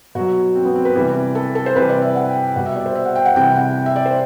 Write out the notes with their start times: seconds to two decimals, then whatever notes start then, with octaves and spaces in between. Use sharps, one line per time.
0.15 B2 F#3 F#4
0.55 C4
0.65 B3
0.76 C4
0.85 B4
0.96 C3 E3 G3
1.35 A4
1.55 A4
1.66 C5
1.75 C3 E3 G3 B4
1.89 D5
2.02 E5
2.15 F#5
2.29 G5
2.56 B2 G3 F#5
2.66 E5
2.76 D5
2.86 C5
2.95 E5
3.05 F#5
3.16 G5
3.26 F#5
3.36 C3 E3 G3 G5
3.56 F#5
3.86 E5
3.96 D5
4.06 C5